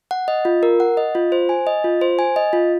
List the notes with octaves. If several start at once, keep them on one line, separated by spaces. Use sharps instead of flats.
F#5
D#5
F4
A#4
F#5
D#5
F4
C5
G#5
D#5
F4
C5
G#5
D#5
F4